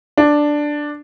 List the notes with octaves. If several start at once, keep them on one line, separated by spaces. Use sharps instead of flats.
D4